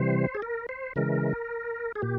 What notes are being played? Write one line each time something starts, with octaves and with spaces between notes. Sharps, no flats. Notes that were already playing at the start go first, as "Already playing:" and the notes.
Already playing: C3 E3 G3 C5
G#4
A#4
C5
C#3 E3 G#3 A#4
G#4
A#2 G4